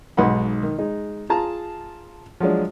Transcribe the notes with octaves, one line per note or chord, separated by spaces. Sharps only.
B1 G#2 F#5 B5
D#3
G#3 D#4
F4 G#4 A5 A#5
F3 F#3 G#3 D4